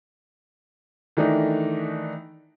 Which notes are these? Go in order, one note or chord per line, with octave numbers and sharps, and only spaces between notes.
D#3 E3 A3 D4 D#4